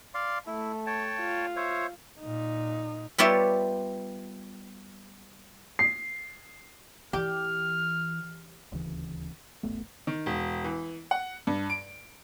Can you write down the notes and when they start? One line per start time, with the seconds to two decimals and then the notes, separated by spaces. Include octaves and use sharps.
0.14 D5 F5 C6
0.47 A3 E4
0.87 C#5 G5 A5
1.20 F4
1.56 C5 C#5 E5
2.21 A#2 D#4
3.18 G3 B3 F4 C#5 D5 E5
5.79 C7
7.13 E3 G4 F6
8.72 D#1 D2 C#3 E3
9.63 D#1 A1 A3 B3
10.07 D#3
10.26 E1
10.64 E3
11.11 F#5
11.47 G2
11.70 D7